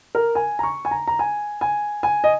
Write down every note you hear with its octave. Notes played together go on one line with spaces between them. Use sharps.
A#4
G#5
A#5
C#6
G#5
A#5
A#5
G#5
G#5
G#5
D#5